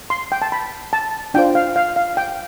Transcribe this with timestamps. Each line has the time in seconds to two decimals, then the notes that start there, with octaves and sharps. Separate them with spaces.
0.10 C6
0.32 G5
0.42 A5
0.52 B5
0.93 A5
1.34 D4 F4 C5 G5
1.55 F5
1.76 F5
1.96 F5
2.17 G5